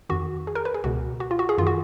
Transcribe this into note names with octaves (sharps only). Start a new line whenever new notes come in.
F2 D#3 F#4
G#4
A#4
B4
G#4
C#2 B2 F#4
F#4
F4
F#4
G#4
F#2 D#3 F4
F#4